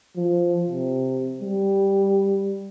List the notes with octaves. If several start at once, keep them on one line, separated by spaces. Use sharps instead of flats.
F3
C3
G3